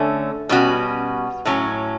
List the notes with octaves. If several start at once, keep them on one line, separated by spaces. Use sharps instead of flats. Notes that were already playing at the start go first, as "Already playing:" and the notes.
Already playing: D3 A3 C#4
B2 G3 C#4 F#4
A2 F#3 C#4